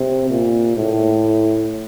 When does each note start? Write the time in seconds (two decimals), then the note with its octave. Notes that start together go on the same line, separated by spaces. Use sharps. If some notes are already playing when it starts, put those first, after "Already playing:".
Already playing: C3
0.30 A#2
0.76 A2